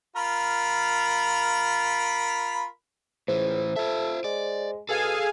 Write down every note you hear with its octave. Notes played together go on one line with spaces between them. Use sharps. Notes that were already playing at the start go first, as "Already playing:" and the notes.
F4 A#4 B5
C#2 A2 E3 C5
F4 A4 E5
G#3 D5
B2 G#4 A4 F5 G#5